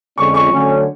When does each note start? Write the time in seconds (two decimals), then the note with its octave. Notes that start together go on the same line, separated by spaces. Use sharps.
0.18 F2 D3 F3 G#3 C#4 C#6
0.34 C#6
0.51 D3 F#3 A3 C#4